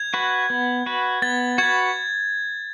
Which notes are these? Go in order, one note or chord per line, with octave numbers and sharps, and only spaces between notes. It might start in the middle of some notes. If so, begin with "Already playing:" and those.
Already playing: G#6
F#4 B4
B3
F#4 B4
B3 A6
F#4 B4 G#6